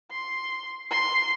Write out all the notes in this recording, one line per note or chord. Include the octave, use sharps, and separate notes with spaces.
C6
C6